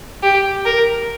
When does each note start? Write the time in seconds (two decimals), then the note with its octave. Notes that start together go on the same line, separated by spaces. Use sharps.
0.23 G4
0.65 A#4